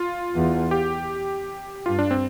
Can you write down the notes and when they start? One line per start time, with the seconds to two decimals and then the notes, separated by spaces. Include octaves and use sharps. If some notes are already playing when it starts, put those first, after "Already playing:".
Already playing: F4
0.35 E2
0.71 G4
1.86 G2 F4
1.99 D4
2.11 C4